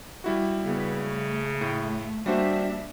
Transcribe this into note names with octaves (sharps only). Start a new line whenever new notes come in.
G3 E4 F#4
C#3 B3
A3
A2
G3 A#3 D4 F#4 C5 E5